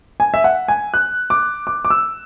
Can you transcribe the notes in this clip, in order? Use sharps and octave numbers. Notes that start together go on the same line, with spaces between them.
G#5
E5
F#5
G#5
F#6
D6
D6
D6
E6